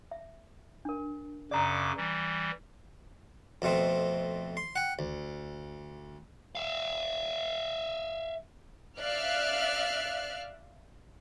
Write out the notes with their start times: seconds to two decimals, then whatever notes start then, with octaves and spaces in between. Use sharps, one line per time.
0.11 E5
0.85 D4 A#4
1.51 F#2 C#3 D5 A#5 D6
1.97 E3 G3
3.62 F2 B2 A3 C4
4.57 C6
4.76 F#5 G5
4.99 D2
6.55 E5 F5
8.99 D5 E5 F5 F6 F#6